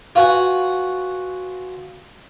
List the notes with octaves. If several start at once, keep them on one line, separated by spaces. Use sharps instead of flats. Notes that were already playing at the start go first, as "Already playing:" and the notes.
F4 F#4 B4 F#5 G#5